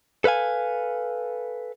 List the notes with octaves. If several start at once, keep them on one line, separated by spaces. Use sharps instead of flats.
A4 B4 C5 F5 G#5